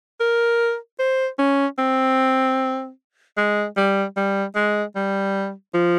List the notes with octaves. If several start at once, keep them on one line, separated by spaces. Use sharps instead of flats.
A#4
C5
C#4
C4
G#3
G3
G3
G#3
G3
F3